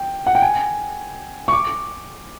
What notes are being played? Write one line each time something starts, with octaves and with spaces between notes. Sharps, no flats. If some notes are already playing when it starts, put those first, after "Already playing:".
Already playing: G5
F#5
G5
G#5
C#6
D6